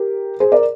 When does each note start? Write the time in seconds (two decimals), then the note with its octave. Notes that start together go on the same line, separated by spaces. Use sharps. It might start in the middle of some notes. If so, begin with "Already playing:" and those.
Already playing: G4 A#4
0.40 G#4 C5
0.52 A#4 D5